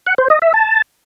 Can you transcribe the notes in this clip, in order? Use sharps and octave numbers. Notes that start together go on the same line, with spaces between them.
F#5
C5
D#5
E5
A5